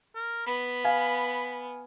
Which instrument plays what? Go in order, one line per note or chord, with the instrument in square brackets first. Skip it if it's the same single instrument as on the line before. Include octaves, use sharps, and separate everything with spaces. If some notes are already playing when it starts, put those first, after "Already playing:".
[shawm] A#4
[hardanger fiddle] B3 [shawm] B5
[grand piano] F5 G#5